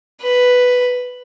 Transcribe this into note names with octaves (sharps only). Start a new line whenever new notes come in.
B4